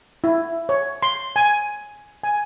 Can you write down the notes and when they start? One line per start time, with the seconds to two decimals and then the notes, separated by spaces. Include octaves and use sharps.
0.24 E4
0.69 C#5
1.03 C6
1.36 G#5
2.23 G#5